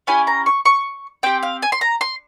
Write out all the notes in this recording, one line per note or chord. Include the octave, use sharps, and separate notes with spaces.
C#4 E4 G4 G#5
A#5
C#6
C#6
C4 G4 G5
F5
G#5
C6
A#5
C6